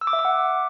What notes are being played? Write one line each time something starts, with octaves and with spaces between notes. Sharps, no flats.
E6
D6
E5
D6
F#5